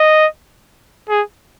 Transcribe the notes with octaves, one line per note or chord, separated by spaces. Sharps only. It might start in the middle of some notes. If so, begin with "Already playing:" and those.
Already playing: D#5
G#4